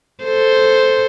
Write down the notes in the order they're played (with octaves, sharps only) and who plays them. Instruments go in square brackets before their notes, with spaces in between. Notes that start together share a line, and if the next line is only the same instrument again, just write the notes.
[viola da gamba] A4 C5